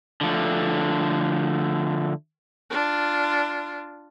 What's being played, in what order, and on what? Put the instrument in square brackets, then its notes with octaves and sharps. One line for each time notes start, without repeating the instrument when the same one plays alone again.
[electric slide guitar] D3 F3 A3
[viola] D4 F4